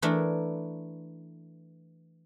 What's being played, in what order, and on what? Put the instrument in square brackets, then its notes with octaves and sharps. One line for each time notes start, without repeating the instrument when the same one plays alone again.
[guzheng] E3 A3 D4 A#4